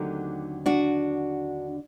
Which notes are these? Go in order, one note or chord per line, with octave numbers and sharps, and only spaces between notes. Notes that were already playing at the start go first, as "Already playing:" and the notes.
Already playing: D#2 D3 F#3 A3 C4 D#4 G4
D4 F#4